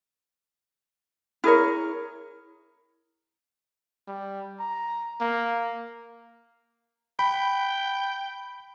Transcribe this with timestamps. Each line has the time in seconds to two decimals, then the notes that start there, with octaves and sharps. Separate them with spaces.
1.44 E4 G#4 A#4 C#5
4.07 G3
4.60 A#5
5.21 A#3
7.19 G5 B5